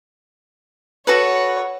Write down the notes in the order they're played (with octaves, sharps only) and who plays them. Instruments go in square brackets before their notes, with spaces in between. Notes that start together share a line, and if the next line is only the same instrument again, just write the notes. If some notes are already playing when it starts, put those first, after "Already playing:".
[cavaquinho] F#4 A4 B4 [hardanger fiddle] C#5 F#5